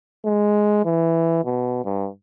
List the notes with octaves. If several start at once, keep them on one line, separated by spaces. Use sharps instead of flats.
G#3
E3
B2
G2